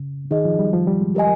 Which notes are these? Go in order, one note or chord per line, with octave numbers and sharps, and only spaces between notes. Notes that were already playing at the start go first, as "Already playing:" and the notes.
Already playing: C#3
D#3 D#4 G#4 D#5
F3
G3
F3
G3
G#3
G4 A#4 D#5 G#5